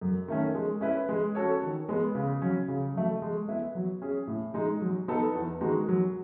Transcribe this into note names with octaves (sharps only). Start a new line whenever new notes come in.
F#2
D#3 A3 C#4
G#3
C#4 E4 B4
G#3
C#4 F#4 A4 C#5
D#3
G#3 B3
C#3
F#3 C#4
C#3
F#3 A3
G#3
B3 E4 B4
F#3
C#4 G#4
A2
G#3 D#4
F#3
B3 D#4 A4
E2
D#3 G#3 D#4 F#4
F#3